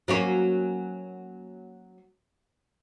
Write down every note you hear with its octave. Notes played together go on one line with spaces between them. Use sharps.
F#3 A#3 C#4